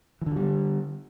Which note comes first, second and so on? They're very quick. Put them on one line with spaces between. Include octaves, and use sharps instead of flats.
E3 D3 F#3 G3